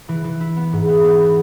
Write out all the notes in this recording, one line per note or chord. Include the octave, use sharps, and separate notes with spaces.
E3
E3
E4
B3
G#2
B3
B3
B3